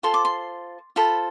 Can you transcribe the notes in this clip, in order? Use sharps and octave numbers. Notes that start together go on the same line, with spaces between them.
F4 A4 C5 C6
D6
C6
F4 A4 C5 B5